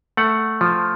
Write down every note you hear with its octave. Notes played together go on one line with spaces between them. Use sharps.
A3 F#5
F3